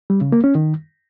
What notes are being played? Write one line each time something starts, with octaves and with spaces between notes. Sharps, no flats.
G3
C#3
A#3
C#4
D#3